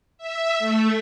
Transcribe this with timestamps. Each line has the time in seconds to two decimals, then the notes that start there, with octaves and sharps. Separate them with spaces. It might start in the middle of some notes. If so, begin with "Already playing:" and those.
0.18 E5
0.59 A3